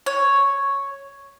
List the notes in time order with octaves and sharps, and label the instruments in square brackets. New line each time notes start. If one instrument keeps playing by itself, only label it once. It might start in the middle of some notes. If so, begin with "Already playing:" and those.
[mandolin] C#5